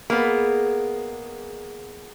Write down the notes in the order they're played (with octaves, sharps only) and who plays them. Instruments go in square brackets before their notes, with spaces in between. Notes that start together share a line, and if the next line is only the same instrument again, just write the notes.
[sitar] G#3 [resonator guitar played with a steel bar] A#3 B3